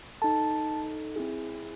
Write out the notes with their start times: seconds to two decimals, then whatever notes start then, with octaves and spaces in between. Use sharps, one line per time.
0.22 D#4 A4 A5
1.16 C4 E4 G#4